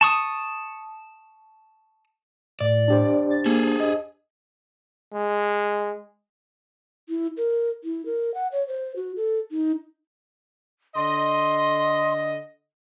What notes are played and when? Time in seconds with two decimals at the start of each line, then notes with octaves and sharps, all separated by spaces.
0.01 A5 C#6 D#6
2.60 A2 D5
2.88 D4 G4 C5
3.30 A6
3.46 A#3 G#4 A4
3.80 D#5
5.13 G#3
7.09 E4
7.37 A#4
7.84 E4
8.06 A#4
8.34 F#5
8.52 C#5
8.68 C5
8.96 F#4
9.16 A4
9.51 D#4
10.96 D3 D#5 C6